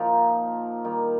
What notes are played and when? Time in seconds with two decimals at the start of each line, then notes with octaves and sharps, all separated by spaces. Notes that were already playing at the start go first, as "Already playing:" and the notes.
Already playing: A#2 F3 A#3 D#4 A#4
0.84 D#3 G3 D#4